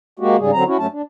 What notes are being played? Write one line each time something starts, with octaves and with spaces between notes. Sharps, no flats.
G#3 A#3 F#4 G4
G#2 C#3 G3 G#4
D3 F#3 C4 A#5
C#4 E4 F#4
G2 F#3 A3 C#4 A5
D4